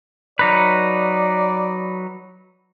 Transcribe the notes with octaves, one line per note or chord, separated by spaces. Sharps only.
F#3 D#4 B4 D5